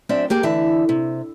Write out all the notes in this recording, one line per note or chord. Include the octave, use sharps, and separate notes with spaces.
F#2 C4 D4 E5
A#3 G4 G#4
D3 E3 E5 A5
C3